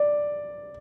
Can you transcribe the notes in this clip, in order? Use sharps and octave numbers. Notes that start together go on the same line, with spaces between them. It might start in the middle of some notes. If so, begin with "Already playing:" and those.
Already playing: D5